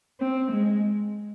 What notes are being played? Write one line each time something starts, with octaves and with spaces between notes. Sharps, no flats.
C4
G#3